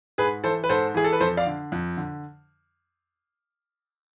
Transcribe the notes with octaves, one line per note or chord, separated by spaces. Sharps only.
G#2 G#4 B4
E3 A4 C5
B4
G#2 A4 C5
E3 G#4
A4
B4
F2 A4 C5
D5 F5
D3
F2
D3